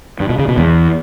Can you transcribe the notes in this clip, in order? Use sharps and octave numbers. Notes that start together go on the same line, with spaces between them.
G2
B2
C#3
B2
E2